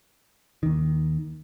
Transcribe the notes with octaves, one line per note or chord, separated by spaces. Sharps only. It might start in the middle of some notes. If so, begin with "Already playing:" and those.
D#2 D#3